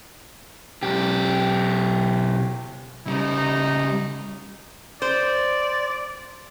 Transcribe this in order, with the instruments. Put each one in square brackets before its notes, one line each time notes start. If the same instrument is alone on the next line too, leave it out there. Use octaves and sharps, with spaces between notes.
[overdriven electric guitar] B1 G4
[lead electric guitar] C#3 G3 [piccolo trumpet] D#4
[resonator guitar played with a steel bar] C5 [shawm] D5